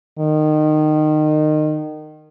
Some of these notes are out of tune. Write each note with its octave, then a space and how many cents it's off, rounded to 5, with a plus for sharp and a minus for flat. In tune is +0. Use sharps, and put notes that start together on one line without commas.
D#3 -25